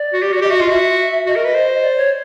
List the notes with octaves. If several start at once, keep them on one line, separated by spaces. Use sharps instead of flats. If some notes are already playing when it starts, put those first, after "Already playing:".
Already playing: D5
F#4
G4
F#4
D5
G4 D#5
F#4 E5
F4 D#5
F#4 E5
F#4 D#5
A#4
B4
C5
D5
C#5